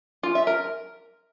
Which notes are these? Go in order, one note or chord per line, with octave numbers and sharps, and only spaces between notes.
F4
E5
A#4